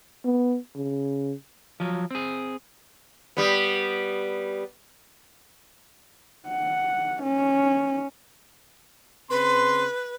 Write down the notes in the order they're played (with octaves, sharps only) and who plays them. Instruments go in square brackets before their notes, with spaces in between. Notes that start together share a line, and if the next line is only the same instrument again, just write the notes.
[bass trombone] B3
C#3
[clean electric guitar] F3 F#3
C4 G#4
[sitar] G3 B3
[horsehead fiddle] F#5
C#4
[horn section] C#3 C4 C6 [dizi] B4